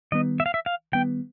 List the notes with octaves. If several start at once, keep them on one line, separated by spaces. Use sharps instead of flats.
D#3 G3 B3 D#5
E5
F5
E5
F5
D#3 G3 B3 G5